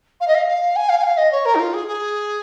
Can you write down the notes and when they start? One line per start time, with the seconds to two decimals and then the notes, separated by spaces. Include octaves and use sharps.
0.21 F5
0.28 D#5
0.35 F5
0.48 F5
0.76 G#5
0.89 F5
0.98 G#5
1.03 F5
1.17 D#5
1.32 C#5
1.45 A#4
1.55 D#4
1.60 F4
1.74 G#4
1.88 G#4